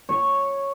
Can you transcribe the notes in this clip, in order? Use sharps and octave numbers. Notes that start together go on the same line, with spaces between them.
C#5